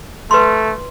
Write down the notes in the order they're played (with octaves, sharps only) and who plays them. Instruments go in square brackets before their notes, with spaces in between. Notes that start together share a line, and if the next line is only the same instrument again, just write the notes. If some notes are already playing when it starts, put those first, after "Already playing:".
[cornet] A3 [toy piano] B4 C6